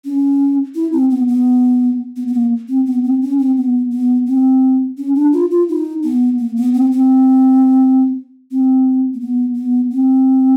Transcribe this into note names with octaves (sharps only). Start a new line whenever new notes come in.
C#4
E4
C4
B3
B3
B3
B3
A#3
C4
B3
C4
C#4
C4
B3
B3
C4
C#4
D4
F4
F4
D#4
B3
A#3
B3
C4
C4
C4
A#3
B3
B3
C4